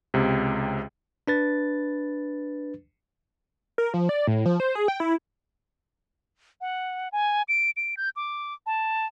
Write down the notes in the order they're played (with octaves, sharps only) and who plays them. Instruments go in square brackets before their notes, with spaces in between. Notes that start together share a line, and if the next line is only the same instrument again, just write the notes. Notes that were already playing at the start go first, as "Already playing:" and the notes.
[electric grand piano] C#2 C3
[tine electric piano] D4 B4 A6
[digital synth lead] A#4
F3
D5
A2
F3
C5
G#4
G5
E4
[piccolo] F#5
G#5
D7
D7
G6
D6
A5